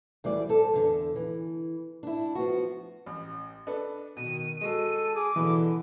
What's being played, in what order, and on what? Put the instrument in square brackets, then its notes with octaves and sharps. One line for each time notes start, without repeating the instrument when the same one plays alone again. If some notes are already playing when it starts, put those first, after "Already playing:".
[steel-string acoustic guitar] D2 E3 G3 D5
C4 A4
E2 D3
E3
D4 E4
F3 B3 F#4
[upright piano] A1
D4 A4 B4
[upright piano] B2 [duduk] D#3 [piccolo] D#7
[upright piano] G#3 F#4 [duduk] A4
[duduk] G#4 [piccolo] D6
[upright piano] B2 B5 [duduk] D3 [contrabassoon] E3